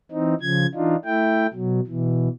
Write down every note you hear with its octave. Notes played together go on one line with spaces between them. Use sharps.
E3 C4 D#4
C#3 F3 G#6
E3 D4 D#4 F4
A3 E4 G5
B2 F#3
B2 E3